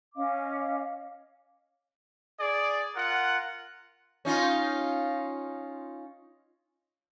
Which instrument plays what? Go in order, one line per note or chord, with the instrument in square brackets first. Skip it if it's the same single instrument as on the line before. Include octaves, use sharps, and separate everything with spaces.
[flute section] C#4 D#5 F5 D6
[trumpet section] G#4 D5
F4 A#4 F#5
[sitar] C#4 D#4 F4